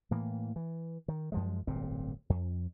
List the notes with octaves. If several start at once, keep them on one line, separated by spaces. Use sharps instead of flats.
A2 E3 A#3
E3
D#3
F#2 F3 G#3
D1 G1 A#2 C4
F2